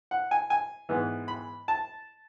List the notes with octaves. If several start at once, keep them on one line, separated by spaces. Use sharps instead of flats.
F#5
G#5
G#5
G#2 E3 B3
B5
A5